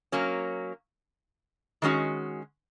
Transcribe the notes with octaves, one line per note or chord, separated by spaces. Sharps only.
F#3 A#3 C#4
D#3 G#3 C#4 F#4